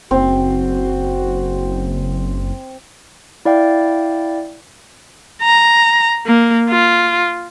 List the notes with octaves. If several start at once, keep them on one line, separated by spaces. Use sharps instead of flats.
F#1 C4 F#4
E4 D5 F5 G5
A#5
A#3
F4